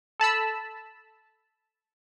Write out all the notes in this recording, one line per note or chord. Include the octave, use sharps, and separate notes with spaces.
A4 A5 B5 E6